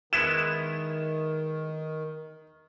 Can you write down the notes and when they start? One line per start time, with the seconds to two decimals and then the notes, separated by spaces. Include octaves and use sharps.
0.13 D#3 G#3 B3 E4 E7